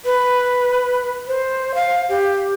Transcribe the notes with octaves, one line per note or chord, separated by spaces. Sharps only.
B4
C5
F5
G4